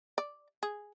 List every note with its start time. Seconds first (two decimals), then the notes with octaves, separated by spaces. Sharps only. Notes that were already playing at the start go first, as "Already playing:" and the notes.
0.18 D5
0.63 G#4